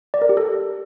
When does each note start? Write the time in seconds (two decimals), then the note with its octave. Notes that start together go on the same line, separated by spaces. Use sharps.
0.14 D5
0.22 A#4
0.29 G4
0.37 A4